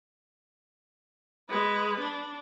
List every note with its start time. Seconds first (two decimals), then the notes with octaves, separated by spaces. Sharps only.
1.49 G#3 B4
2.00 D4